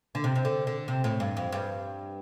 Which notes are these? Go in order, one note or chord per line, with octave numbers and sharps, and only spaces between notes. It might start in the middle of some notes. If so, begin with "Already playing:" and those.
D3
C3
C3
D3
D3
C3
A2
G2
F2
G2